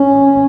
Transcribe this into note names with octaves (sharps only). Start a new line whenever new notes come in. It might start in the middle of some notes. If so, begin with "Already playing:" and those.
Already playing: C#4